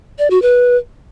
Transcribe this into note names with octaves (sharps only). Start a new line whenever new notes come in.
D5
F#4
B4